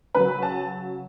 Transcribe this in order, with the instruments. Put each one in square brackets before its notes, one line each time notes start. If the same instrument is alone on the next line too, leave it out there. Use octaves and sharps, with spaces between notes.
[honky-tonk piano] C#3 F#3 B4
A5